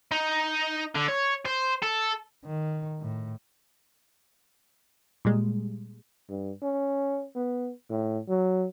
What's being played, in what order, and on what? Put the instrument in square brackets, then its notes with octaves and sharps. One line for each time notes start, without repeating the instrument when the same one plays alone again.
[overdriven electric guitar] D#4
D3
C#5
C5
A4
[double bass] D#3
A2
[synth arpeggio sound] A#2 G3 G#3
[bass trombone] G2
C#4
B3
A2
F#3